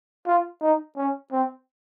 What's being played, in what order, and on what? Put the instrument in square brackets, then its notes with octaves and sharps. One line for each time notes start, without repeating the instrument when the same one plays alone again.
[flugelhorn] F4
D#4
C#4
C4